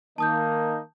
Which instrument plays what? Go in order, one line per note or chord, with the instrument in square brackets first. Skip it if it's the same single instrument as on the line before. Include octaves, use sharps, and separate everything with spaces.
[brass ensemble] D#3 A#3 D#4 [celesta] A5 D#6 G6